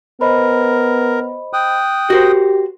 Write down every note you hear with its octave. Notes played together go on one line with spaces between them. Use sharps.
B3 A#4 C5 D#5 B5
G5 D#6 F#6
F#4 G4 A#4 C5